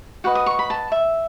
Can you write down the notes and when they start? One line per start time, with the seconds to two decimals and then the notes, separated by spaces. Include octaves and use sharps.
0.24 F#4 B4 D#5 F#5
0.35 D#6
0.46 C#6
0.59 B5
0.70 A5
0.92 E5